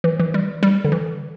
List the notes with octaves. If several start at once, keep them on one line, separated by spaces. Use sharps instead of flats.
E3
E3
G3
G3
D3
E3